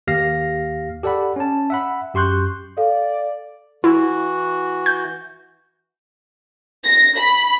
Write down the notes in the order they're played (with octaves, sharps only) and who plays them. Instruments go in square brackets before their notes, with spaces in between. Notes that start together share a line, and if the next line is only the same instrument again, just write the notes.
[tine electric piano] D#2 G4 F5 F6 A#6 C7
G4 A4 D5 F#5 B5
C#4 A5
E5 F#5 B5
F#2 G4 C6 C#6 F#6 G6
[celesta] A4 F5 [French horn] D5
[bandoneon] E3 F#4 [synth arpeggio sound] E4
[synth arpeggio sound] G6
[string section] A#6
B5